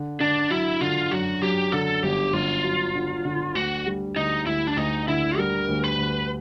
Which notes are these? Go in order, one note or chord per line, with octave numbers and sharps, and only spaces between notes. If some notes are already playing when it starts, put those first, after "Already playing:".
Already playing: D3
D3 D4
F#3 E4
D3 F4
F#2 F#4
F#2 G4
D3 A4
G1 G4
G1 F4
F#3
D3
D3
D2 F#4
G3
D2 D#4
D2 E4
D4
D2 D#4
D3 E4
G3 A#4
D2
B4
D2